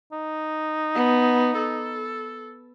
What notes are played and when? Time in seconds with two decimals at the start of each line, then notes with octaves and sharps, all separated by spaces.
0.13 D#4
0.95 B3
1.57 A4